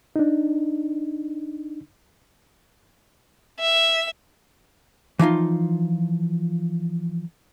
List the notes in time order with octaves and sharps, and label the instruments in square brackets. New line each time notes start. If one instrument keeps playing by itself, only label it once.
[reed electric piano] D4 D#4
[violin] E5
[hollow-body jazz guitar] E3 F3 D#4 F4